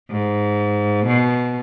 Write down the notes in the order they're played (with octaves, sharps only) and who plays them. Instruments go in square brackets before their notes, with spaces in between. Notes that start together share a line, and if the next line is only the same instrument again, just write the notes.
[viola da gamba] G#2
B2